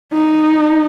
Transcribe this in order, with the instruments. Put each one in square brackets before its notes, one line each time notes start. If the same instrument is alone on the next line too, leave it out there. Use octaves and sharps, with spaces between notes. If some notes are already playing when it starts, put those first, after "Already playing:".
[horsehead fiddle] D#4